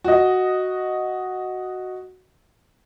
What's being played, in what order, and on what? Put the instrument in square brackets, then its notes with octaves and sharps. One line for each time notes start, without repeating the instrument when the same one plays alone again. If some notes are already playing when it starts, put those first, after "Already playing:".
[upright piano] F#4 D#5